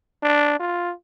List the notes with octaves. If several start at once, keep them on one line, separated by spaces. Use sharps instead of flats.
D4
F4